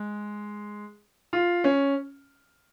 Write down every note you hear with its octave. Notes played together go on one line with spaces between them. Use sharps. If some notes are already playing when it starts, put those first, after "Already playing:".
Already playing: G#3
F4
C#4